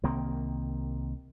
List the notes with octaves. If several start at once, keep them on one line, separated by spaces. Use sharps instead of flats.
C2 D#3 A#3 C4